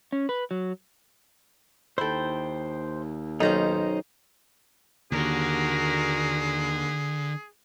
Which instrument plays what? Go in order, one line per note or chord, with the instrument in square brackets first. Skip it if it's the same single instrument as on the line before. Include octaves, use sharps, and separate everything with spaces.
[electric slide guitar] C#4
B4
F#3
[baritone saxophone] D#2 [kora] E4 A4 [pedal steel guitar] C5 G5
[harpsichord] B1 A#5 [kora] D#3 C#4 [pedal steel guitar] D#4 C5
[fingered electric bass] D#2 [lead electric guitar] D3 [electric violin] F#4 A#4 [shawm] G#4